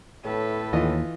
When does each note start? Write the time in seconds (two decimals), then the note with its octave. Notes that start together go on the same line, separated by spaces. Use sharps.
0.24 A2 A4 B4
0.73 D#2 E3 F4 D#5